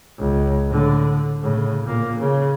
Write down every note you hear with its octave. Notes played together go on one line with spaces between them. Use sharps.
C#2
A2 D3
A2 C#3
A#2 A#3
C#3